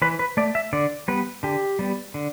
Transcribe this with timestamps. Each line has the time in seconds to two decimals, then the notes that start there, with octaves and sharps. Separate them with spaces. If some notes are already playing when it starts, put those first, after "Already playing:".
0.02 E3 B4
0.19 B4
0.37 A3 D5
0.55 E5
0.73 D3 D5
1.08 G3 B3 B4
1.43 D3 G4
1.79 G3 B3
2.14 D3